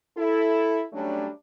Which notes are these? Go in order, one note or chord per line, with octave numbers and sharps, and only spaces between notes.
E4 A4
F#3 G3 A3 C#4 D4